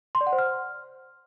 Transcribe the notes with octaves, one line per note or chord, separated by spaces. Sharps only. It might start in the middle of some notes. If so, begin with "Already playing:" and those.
C6
D5
F#5
C5
F6